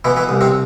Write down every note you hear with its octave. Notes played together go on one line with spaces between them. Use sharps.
B2 E3 E4
E3 E4
C2
C3 C4